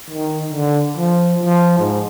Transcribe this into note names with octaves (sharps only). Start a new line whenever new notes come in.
D#3
D3
F3
F3
G#2